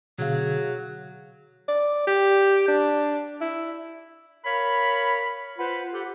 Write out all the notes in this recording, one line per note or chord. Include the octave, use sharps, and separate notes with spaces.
B2 D3 F#3 G#4 F5
D5
G4
D4
E4
A#4 C#5 F5 B5
F4 B4 C5 F#5 B5
G4 A4 F#5